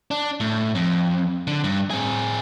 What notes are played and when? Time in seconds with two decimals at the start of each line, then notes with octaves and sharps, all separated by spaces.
0.11 D4
0.40 A2
0.75 F2
1.47 D3
1.64 G2
1.91 C4 G#4